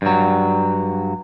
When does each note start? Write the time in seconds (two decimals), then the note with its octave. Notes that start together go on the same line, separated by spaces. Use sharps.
0.02 G2 F#3